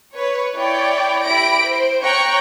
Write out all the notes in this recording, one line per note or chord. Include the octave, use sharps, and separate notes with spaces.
B4 C#5
E4 C#5 D5 G5
E4 G4 B5 A#6 D7
C5
C#5 G5 A#5 C#6 F#6